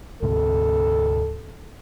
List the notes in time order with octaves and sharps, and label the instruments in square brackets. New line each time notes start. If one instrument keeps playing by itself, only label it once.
[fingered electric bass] D2 G#2 C3 [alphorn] A4